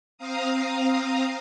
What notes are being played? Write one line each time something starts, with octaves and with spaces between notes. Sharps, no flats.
C4 F5 A#5 D#6